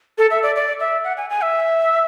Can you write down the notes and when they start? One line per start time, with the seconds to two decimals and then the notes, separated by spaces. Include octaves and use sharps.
0.18 A4
0.31 E5
0.43 D5
0.56 D5
0.80 E5
1.04 F#5
1.17 G#5
1.30 G#5
1.42 E5